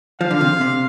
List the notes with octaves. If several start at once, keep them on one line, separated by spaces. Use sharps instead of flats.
F3 F5
D3
C3
C3